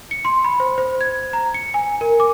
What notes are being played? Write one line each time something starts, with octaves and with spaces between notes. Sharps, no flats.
C#7
C6
B5
C5
C5
G#6
A#5
C#7
G#5
A#4
D6